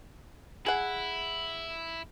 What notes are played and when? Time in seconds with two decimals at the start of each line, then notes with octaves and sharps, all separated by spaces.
0.66 E4 G#4 F#5